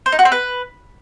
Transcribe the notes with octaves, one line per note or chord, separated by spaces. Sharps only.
C5
D#4
F#4
C4
B4